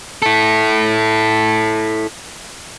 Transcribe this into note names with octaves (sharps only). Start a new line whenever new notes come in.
E4 A4